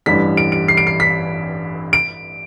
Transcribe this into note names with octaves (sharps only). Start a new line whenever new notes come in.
A1 G2 E3 G3 B6
D7
D7
C7
D7
C7
B6
D7